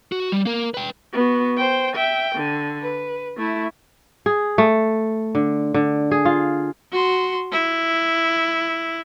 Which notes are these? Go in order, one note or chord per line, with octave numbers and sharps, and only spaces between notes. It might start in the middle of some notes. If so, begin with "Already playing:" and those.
F#4
G3
A#3 A#4
B4 G5
B3 F#4
C5 G5
E5 G5
D3
B4
A3 E4
G#4
A3
D3
D3
G#4
F4
F#4 C6
E4